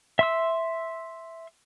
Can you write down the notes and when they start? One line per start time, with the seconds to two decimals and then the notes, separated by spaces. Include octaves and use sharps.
0.19 E5 C6 E6